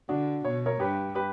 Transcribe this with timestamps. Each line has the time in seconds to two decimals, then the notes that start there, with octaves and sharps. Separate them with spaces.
0.09 D3 D4 F#4
0.45 B2 C#5
0.66 A#4 C#5
0.80 G2 G4 B4
1.15 G4 B4